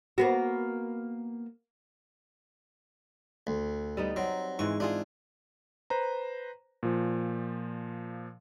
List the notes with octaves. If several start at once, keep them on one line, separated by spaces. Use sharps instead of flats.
A#3 B3 F#4
D2
G3 B3 D#4
F#3 C4
G#2 E3 G#3 C#6
E3 D4 F4 G#4
B4 C5 A#5
A#2 F3